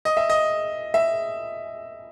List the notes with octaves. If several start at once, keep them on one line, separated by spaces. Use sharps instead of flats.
D#5
E5
D#5
E5